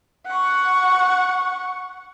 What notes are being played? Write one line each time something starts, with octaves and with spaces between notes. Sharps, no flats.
F#5 C#6